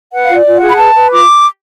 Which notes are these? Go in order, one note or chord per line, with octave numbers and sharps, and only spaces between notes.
B4 F#5
F5
F4
D5
F4
F#5
G#4
B5
B4 A5
B4
F4 D6